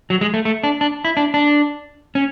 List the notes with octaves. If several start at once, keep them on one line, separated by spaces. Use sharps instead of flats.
F#3
G#3
A3
A3
D4
D4
E4
D4
D4
C#4